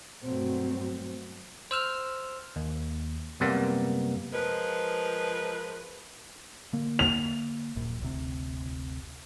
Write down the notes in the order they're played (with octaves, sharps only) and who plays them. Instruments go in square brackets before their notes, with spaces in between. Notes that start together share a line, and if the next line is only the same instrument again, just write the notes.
[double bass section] G2 B2 F#3 A3 C4
[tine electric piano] C5 E6 F6
D#2
F#2 C3 G3 A#3 B3
[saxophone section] F3 G#3 A#4 B4
[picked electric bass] D3 A#3
[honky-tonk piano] F7
[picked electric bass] D#1 A#1 F#2
F#1 D2 C3